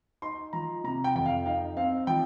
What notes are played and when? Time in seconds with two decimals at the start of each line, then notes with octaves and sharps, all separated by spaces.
0.22 D#4 C6
0.53 F3 A#5
0.84 C3 A#5
1.04 G5
1.15 F2 G5
1.26 F5
1.46 D#4 F5
1.77 C4 F5
2.07 F3 G5